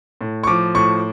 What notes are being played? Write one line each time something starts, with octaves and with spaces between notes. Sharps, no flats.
A2
C#6
F3 D6
A2 C#6